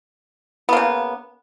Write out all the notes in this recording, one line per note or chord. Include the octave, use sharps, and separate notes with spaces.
C#3 A#3 B3